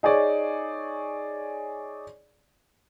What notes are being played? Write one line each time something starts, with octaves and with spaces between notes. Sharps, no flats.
D#4 G#4 C#5 D5